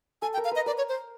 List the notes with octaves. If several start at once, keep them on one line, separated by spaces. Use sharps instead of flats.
A4 G#5
G5
A#4
F5
B4 D#5
A#4 D5
C#5
C5